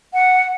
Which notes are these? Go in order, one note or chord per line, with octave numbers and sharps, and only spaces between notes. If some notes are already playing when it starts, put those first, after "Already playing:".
F#5